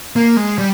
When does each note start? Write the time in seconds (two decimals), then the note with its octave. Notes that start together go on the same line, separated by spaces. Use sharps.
0.16 A#3
0.37 G#3
0.58 G3